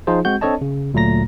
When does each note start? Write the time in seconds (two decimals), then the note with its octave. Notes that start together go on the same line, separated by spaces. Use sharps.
0.07 F3 D#4 F4 G#4 C5
0.25 G#3 C4 F#4 F#5 G6
0.41 C4 D4 A4 C#5 D#5 A5
0.61 C#3
0.94 D2 A#2 F#3 A3 A#5 A#6